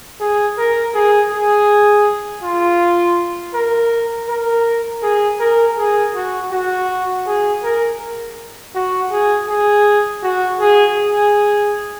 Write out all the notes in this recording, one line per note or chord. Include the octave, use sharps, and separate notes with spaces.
G#4
A#4
G#4
G#4
F4
A#4
A#4
G#4
A#4
G#4
F#4
F#4
G#4
A#4
F#4
G#4
G#4
F#4
G#4
G#4